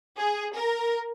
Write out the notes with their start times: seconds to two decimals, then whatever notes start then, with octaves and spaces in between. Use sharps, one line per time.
0.18 G#4
0.55 A#4